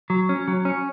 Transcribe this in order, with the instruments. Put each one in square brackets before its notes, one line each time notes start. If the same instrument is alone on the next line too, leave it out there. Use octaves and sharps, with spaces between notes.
[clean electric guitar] F#3
C#4
F#3
C#4